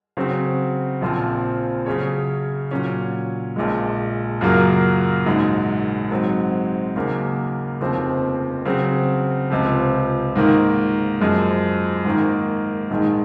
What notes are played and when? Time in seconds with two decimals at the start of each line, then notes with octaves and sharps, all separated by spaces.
0.17 C#3 F#3 C4 F#4
1.01 A#1 A#2 F3 C4 F4
1.86 C#3 F#3 C#4 G#4 C#5
2.71 A#2 F#3 C#4
3.56 A#1 A#2 G#3
4.41 F#2 C#3 F#3 A#3 F4
5.26 A#1 G#2 F#3
6.11 G#2 F#3 C4
6.96 D#2 C#3 F#3 A#3
7.81 F1 D#2 C#3 F3 C4
8.65 C#3 F#3 C4 F#4
9.50 C#2 C3 F3
10.36 G#2 D#3 A#3
11.21 F#2 F3 G#3
12.05 G#2 D#3 A#3
12.90 A#1 G#2 D#3 G#3